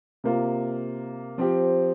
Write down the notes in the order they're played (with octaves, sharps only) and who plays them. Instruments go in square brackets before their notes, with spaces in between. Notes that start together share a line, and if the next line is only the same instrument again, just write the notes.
[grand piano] C3 A#3 F4
F3 C4 G4